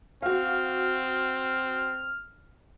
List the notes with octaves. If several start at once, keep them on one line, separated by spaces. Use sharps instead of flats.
C4 F#4 F5 F6